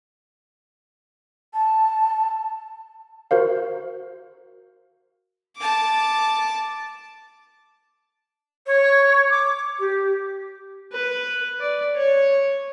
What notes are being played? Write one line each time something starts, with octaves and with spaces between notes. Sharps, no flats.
A5
F#4 A#4 C5 F5
A5 D6
C#5
D6
G4
B4
D5
C#5